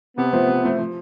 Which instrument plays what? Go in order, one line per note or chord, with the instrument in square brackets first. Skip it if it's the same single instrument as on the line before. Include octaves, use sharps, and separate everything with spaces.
[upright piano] C3 [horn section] B3
[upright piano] F3 A3 C4
C3
F3 A3 C4
F3